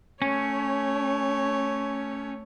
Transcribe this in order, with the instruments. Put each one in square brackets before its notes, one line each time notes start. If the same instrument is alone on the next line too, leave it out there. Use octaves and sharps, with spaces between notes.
[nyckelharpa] A3 C#5 [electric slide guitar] C#4